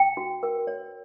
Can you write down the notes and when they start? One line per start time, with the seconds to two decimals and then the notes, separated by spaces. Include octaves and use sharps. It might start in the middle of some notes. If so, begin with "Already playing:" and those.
Already playing: G5
0.17 F#4
0.43 A#4
0.67 C#5